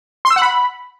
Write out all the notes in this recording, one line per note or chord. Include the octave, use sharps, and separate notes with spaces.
C6
E6
F#5
B5